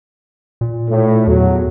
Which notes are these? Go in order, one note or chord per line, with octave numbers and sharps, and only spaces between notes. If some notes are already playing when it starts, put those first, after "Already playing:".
A#2
A2
E2 F#3